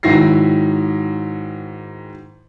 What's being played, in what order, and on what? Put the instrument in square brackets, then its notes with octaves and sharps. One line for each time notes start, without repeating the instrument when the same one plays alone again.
[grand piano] G#2 D#3 F#3 E4 A#6 C7